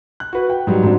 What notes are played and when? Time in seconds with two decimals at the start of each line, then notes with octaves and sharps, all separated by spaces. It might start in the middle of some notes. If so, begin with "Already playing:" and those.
0.20 F#6
0.33 F#4 B4
0.50 G5
0.67 G#2 F#3 G3
0.83 G#2 F#3 C4 D4